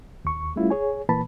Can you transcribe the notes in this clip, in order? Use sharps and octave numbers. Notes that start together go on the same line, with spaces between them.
D#2 C#6
G3 A3 C#4 E4 F4
G#4 C#5 G#5
A#2 E3 A#3 B4 A5 B5